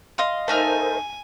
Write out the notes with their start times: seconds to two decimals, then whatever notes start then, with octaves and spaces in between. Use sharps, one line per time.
0.18 D#5 F5 C6
0.48 A3 D#4 A#4 C5 G#5 F6